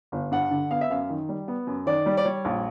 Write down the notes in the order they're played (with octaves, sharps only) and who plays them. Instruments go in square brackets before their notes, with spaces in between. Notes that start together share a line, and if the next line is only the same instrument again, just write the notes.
[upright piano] G1
G2 F#5
D3
B3 F5
E5
F#2 F5
D#3
G3
B3
F#2
D#3 D5
G3
D5
G3 C#5
A#1